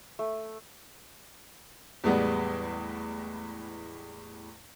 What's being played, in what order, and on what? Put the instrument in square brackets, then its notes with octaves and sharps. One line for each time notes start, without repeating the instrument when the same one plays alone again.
[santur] A3
[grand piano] E2 A2 G3 G#3 B3